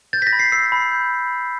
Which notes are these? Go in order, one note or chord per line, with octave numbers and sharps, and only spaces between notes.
G6 A6
B6
A#6
B5
C7
E6 C7
B5
G6